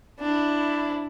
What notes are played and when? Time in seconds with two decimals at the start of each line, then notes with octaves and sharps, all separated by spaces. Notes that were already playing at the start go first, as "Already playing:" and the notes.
0.20 D4 E4